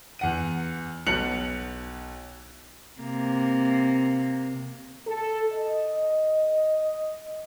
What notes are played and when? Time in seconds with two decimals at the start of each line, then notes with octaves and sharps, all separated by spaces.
0.19 E2 F#5 D#7
1.07 B1 B2 F#6 C#7 F7 F#7
3.01 C3 A#3
5.07 A4
5.53 D#5